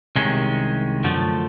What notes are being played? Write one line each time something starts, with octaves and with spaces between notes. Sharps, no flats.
C2 C3 D#3 G#3 C#4
F#2 D3 F3 A3